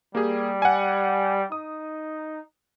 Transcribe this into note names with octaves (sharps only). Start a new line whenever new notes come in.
G3 A#3 G4 G#4
F#5 G#5
D#4 D#6